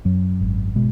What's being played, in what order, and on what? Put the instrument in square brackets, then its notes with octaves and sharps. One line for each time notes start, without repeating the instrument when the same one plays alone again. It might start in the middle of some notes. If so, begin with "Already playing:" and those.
[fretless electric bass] F#2 F#3
G#1
B2 G#3